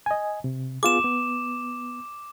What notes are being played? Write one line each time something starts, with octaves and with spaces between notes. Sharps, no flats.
D#5 G#5
C3
B3 F4 G#4 D6 E7
B3